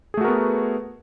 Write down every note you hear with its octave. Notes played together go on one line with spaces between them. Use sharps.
A3 B3 F#4 G#4 A#4